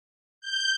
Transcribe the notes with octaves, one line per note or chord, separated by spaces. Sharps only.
G6